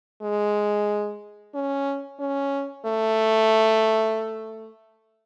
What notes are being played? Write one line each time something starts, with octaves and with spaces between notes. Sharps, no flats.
G#3
C#4
C#4
A3